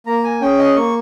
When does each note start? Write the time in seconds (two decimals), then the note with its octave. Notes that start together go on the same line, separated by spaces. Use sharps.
0.06 A#3 A#5
0.24 G#5
0.41 C#4 G#4 G5
0.58 D#5
0.76 A#3 C#6